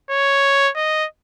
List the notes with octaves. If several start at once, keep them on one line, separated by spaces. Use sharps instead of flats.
C#5
D#5